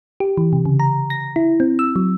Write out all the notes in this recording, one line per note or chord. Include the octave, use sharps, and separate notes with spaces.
G4
E3
C3
C#3
A#5
A#6
E4
C4
E6
F#3